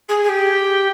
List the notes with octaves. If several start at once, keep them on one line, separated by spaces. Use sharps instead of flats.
G#4
G#4
G4